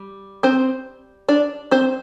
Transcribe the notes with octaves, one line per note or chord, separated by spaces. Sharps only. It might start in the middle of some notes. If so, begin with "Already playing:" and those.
Already playing: G3
C4 C5
D4 D5
C4 C5